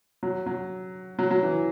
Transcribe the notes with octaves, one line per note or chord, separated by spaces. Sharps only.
F#3
F#3
F#3
F#3
E3